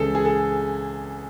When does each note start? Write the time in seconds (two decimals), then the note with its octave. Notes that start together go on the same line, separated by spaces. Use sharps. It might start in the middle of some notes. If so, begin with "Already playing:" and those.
Already playing: C#2 C#3 E3 G#4 A4
0.15 G#4
0.25 A4